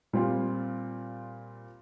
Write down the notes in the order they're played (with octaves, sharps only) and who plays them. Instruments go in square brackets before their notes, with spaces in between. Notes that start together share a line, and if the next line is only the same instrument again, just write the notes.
[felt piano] A#2 G3 C4 F4